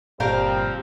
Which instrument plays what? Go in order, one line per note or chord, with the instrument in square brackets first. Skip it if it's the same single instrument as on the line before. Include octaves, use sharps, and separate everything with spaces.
[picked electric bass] G1 A#2 [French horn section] F3 G3 C4 [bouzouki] G4 A#4 F5